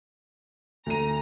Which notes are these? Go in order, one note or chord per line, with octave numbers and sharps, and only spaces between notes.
D2 A#5 D#7